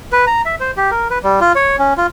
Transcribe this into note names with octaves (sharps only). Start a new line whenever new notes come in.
B4
A#5
E5
C5
G4
A#4
B4
G3
F4
C#5
C#4
F4